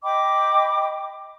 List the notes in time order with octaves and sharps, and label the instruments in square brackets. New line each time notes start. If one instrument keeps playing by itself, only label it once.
[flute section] D#5 G5 B5 D6